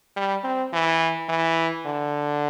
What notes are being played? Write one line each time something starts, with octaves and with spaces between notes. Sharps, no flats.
G3
C4
E3
E3
D3